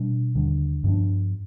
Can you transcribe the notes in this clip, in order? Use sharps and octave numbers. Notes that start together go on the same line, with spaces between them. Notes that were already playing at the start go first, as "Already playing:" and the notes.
Already playing: B2 G3 D4
D#2 D3 G3
G2 F3 B3 D4